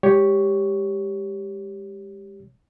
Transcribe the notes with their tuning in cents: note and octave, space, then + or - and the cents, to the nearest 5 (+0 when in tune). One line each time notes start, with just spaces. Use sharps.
G#3 -20 G4 +0 C#5 +5